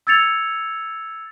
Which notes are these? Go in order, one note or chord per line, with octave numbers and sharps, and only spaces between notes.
E6 G#6 A6 C#7 F7